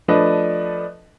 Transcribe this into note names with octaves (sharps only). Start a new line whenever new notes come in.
F3 A3 D4 B4 D#5